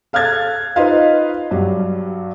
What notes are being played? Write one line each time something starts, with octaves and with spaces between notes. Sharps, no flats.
A4 F5 F6 F#6 G#6 A6
D#4 F4 B4 C5 D#5 F5
G2 F#3 G3